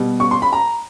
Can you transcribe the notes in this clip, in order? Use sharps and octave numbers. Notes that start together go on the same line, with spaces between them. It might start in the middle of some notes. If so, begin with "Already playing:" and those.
Already playing: B2 G3
C#6
C6
B5
A#5